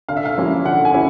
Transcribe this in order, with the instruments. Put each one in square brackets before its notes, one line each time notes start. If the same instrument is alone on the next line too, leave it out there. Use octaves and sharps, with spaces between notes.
[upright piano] D3 [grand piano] F5
[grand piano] E5
F5
[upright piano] F3 A#3 C#4 E4
[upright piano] D3 [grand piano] F#5
[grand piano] G#5
[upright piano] C#4 E4